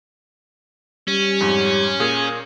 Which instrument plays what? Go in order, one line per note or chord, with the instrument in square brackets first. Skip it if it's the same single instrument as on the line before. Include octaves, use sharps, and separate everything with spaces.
[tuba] G3 [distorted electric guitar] C#4
[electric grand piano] F2 G#2
A#2 G#4 A#4